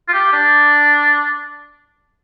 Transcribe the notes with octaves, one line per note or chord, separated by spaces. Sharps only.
F4
G4
D4